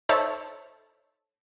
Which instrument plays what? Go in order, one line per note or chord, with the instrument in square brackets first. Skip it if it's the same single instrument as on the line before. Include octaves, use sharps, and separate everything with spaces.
[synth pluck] D#4 A4 C5 C#5 E5 A5